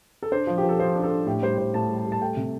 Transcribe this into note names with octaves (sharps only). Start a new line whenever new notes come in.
A4
D4 C5
F3
G4
F3
A4
F3 C5
D4
A4
D4
A2 G4
G3 C5
A2 C5
A2 A5
G3
A5
G3
A5
A3 G5
C3